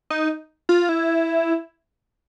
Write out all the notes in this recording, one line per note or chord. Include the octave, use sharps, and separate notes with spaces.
D#4
F4
E4